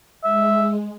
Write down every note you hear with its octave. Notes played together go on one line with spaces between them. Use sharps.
G#3 E5